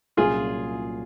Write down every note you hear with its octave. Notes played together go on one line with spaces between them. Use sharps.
C2 A#2 F#3 C#4 F4 G#4